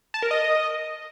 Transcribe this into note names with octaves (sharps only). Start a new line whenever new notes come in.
A5
A#4
D#5